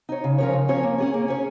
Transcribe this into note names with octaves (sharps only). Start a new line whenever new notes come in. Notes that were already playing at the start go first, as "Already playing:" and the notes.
D#4 C#5
C#3
F3 C#4 A#4 C#5
C#3
F3 C#4 A#4 C#5
A#3
C#4 G#4 C#5
A#3
C#4 G#4 C#5